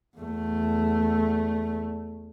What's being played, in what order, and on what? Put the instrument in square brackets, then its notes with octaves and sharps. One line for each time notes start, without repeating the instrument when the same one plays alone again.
[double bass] E2 A3